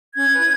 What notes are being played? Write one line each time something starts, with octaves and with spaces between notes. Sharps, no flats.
C#4 G#6
E4 B4